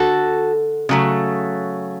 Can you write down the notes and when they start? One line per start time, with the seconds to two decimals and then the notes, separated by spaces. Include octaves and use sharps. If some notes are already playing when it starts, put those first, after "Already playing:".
Already playing: D3 F#4 A4
0.89 C#3 F#3 A3